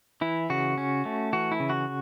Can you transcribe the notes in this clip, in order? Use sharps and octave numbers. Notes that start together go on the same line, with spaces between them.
E3 E4
C#3 F#4
C#4
A3
E3 F#4
E4
C#3
F#4